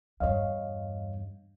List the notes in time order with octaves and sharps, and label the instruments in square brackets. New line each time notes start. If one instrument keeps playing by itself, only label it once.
[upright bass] E2 G2 [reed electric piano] C#5 D#5 F5